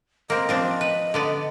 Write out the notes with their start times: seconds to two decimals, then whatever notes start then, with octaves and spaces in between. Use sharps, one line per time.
0.30 A#3 C4 D#5
0.49 F3 C4 D4
0.81 B4
1.14 D3 B3 D5